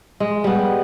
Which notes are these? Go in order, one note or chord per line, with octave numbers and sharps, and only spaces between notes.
G#3
G3 B3